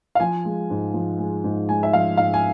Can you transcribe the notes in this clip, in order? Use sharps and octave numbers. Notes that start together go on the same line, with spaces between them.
F5
F3 G#5
G#3
G#2
F3
G#3
G#2
G#3 G#5
E5
F3 F5
G#2 F5
G#5